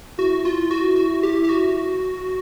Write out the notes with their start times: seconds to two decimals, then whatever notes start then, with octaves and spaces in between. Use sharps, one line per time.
0.19 E4 F#4
0.45 F4
0.71 F#4
0.96 F#4
1.23 G4
1.44 G4
1.49 F#4